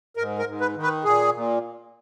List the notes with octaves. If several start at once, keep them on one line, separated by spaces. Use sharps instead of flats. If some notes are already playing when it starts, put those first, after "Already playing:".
G#2 A#4
A#4
G#2
B4
D#3
B4
A#2 G#4
A#2